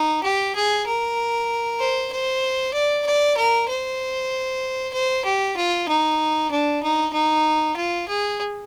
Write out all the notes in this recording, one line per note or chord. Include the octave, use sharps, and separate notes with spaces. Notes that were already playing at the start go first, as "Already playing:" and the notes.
Already playing: D#4
G4
G#4
A#4
C5
C5
D5
D5
A#4
C5
C5
G4
F4
D#4
D4
D#4
D#4
F4
G#4